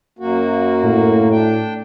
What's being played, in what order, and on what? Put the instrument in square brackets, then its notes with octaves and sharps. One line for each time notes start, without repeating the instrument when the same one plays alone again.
[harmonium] F#2 A#3 F#4
[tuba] A2
[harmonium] D4 G5